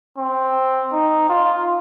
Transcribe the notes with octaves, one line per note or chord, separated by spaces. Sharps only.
C4
D#4
F4